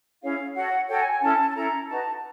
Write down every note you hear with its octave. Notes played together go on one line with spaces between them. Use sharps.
C#4 E4 G#4 C#5 F5
F#4 A4 C#5 F#5
F#4 A4 C#5 G5
G#5
G#5
C#4 E4 A4 A5
A5
C#4 E4 A4 A#5
D#4 F#4 B4 A5